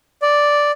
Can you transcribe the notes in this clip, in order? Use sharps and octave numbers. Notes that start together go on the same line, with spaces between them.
D5